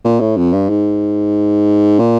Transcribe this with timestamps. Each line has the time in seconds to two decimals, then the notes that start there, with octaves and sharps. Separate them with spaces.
0.04 A#2
0.20 A2
0.37 F2
0.53 G2
0.69 G#2
1.99 A#2